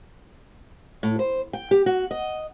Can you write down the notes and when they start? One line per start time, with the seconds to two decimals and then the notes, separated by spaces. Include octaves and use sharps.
1.03 A2
1.19 C5
1.53 G5
1.71 G4
1.86 F#4
2.11 D#5